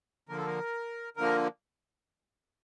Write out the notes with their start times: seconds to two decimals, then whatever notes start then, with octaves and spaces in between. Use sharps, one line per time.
0.29 D3 F3 A#3 A#4
0.38 A4
0.46 A#4
1.17 D3 F3 A#3 A#4